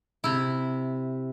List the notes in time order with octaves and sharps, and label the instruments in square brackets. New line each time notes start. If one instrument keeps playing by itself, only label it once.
[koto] C3 E4